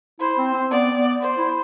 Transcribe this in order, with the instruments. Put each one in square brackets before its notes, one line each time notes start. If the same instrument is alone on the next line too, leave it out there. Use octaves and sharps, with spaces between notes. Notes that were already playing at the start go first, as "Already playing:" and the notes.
[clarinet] E4 [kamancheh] C5
[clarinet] C4
C4
[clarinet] B3 [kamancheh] D5
[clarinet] B3
[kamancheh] C5
[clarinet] E4